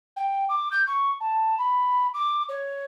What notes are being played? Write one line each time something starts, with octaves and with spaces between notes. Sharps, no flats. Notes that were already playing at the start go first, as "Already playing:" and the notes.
G5
D6
G6
C#6
A5
B5
D6
C#5